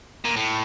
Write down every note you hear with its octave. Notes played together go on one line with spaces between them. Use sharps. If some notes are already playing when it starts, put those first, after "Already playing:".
A#2
A2